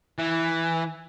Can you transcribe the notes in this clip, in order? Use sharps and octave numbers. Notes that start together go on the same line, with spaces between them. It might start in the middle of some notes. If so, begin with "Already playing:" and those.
E3